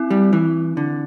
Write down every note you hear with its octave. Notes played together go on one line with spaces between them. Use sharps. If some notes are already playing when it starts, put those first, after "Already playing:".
Already playing: C4 E4
G3
E3
D3